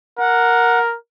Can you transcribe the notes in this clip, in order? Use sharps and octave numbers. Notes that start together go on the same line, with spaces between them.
A#4 F#5